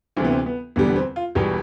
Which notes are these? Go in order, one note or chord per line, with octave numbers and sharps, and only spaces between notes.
D2 C3 E3 C4
B3
C4
B3
E1 E2 D3 G3 B3
B3
C4
F4
E1 E2 B2 G3 G4